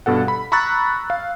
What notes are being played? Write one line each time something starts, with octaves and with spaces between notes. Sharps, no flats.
G2 B2 A4 F#5
B5
A#5 B5 C#6 E6 F#6 A6
F5